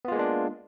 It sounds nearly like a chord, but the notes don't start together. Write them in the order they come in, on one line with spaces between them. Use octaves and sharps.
B3 F4 G#3 A#3 D4